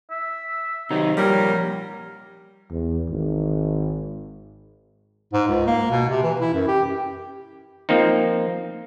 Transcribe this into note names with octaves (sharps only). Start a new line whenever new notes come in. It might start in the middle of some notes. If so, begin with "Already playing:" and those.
E5
C3 D#3 F#3 D#4
A#2 F3 G3 A#4 C#5
E2
G#1
G#2
C#2
A#3
B2
C3
E3
E4
F#2
G4
F3 A#3 C4 D#4